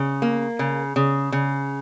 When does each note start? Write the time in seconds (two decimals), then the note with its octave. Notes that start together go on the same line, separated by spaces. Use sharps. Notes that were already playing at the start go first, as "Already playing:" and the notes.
Already playing: C#3
0.22 A#3
0.59 C#3
0.96 C#3
1.32 C#3